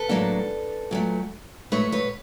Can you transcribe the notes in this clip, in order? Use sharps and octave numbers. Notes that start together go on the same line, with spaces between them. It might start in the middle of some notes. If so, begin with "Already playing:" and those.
Already playing: A4 B4
A2 F#3 A#3 D4
A#2 F#3 A3
A#2 F#3 A3 B4 C#5
B4 C#5